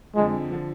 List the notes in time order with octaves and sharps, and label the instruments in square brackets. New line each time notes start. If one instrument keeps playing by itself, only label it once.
[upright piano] F2 D3 F3 [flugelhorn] G#3
[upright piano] D3 F3